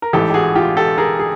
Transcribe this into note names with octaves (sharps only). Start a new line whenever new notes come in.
A#4
A1 G#2 E3 G4 A4
G4
F#4 G#4
F4 G4
G4 A4
G#4 A#4
G#4